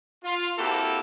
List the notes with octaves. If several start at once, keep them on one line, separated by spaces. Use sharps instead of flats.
F4
A#3 C4 E4 F#4 G4 A4